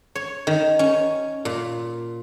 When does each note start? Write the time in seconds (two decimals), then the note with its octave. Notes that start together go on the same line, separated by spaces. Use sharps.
0.15 C#5
0.47 D#3
0.79 C#4
1.45 A#2